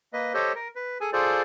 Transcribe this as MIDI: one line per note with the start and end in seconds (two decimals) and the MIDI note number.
0.13 0.33 58
0.13 0.33 71
0.13 0.33 75
0.34 0.52 67
0.34 0.52 69
0.34 0.52 72
0.34 0.52 73
0.34 0.52 75
0.55 0.68 70
0.76 0.98 71
1.01 1.10 68
1.01 1.10 69
1.01 1.10 80
1.13 1.42 65
1.13 1.42 68
1.13 1.42 69
1.13 1.42 72
1.13 1.42 74